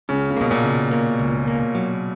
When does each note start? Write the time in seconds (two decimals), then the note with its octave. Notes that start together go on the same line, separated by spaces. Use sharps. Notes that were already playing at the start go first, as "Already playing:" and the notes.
0.09 C#2 C#3
0.31 C#3
0.37 B2 A#3
0.51 A#2
0.64 C#3
0.91 A#3
1.19 C#2
1.47 A#3
1.75 F#3